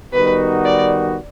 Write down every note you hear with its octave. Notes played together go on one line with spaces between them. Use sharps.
D#3 G3 B3 D#4 F#4 B4
D5